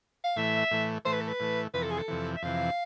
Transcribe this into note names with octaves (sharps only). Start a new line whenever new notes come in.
F5
A2 E3 A3 E5
A2 E3 A3
A2 E3 A3 C5
B4
A4
B4
A2 E3 A3
F2 C3 E3 B4
A4
G#4
A4
F2 C3 E3
E5
F2 C3 E3 F5